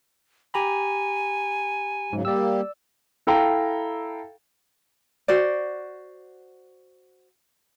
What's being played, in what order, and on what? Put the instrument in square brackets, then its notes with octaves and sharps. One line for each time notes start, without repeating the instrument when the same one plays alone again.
[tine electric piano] G4 A#5 B5 [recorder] G#5
[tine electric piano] G#2 [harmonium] C#3 F#3
[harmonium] G3 A#3 G4 [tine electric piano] D5 E6
[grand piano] E4 A4 F5 G5 A#5
[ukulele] F#4 C5 D5